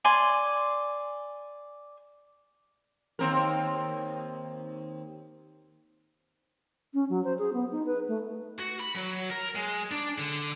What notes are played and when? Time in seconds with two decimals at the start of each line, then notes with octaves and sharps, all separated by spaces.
0.05 D5 G#5 C6
3.19 D#2 C4 A#4
6.94 C#4
7.09 F#3
7.24 C5
7.39 G#4
7.53 B3
7.71 D#4
7.86 B4
8.08 A3
8.60 F#4
8.80 B5
8.96 F#3
9.30 A#4
9.56 G#3
9.92 D4
10.18 D3